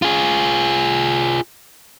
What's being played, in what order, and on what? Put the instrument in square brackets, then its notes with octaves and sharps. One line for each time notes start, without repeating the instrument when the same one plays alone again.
[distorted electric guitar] F4 G#4